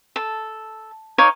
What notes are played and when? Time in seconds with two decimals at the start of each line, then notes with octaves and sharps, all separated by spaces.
0.16 A4
1.18 D#4 C#5 F5 D6